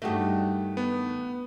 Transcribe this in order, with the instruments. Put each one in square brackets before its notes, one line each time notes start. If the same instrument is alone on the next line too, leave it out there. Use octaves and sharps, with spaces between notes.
[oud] G2 D#3 [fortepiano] A3 F#4 G4
[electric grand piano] B3